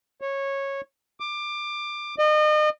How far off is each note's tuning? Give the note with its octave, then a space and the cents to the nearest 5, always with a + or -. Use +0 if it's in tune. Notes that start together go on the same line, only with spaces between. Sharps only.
C#5 -15
D6 +20
D#5 -35